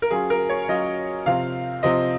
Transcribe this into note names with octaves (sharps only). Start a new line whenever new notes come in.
A#4
F#3 C#4 F4 G#4
A#4
C#5
F#3 C#4 F4 D#5
C3 F3 C4 F5
C3 F3 C4 D#5